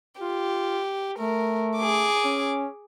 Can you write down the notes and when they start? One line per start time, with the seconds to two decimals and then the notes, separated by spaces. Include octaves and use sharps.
0.21 F4 G4
1.19 A3 A#4
1.77 G#4 D6
2.24 C#4